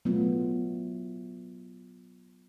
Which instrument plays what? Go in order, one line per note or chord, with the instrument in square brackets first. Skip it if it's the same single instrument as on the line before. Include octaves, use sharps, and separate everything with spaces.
[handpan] F#3 A3 B3 F4